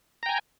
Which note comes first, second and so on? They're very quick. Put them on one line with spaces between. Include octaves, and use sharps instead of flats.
A#5 G5 G#5